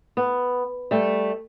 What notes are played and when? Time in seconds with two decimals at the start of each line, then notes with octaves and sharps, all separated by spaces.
0.17 B3
0.91 G3 A3